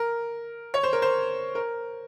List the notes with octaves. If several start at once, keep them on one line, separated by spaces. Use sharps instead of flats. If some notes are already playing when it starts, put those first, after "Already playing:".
Already playing: A#4
C#5
C5
A#4
C5
A#4